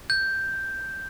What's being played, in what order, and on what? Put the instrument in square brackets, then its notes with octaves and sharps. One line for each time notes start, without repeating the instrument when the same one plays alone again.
[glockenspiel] G6